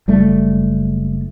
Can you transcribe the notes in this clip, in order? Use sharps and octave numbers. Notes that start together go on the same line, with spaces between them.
F#1 G3 A3